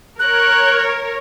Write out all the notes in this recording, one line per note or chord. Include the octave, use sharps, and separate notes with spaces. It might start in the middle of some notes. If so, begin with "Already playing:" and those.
A#4 C#5 F#6